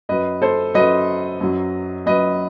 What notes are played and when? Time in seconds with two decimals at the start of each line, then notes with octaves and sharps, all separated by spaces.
0.09 F#2 F#3 B4 D#5
0.42 A4 C5
0.74 F#2 F#3 B4 D#5
1.41 F#2 F#3
2.06 F#2 F#3 B4 D#5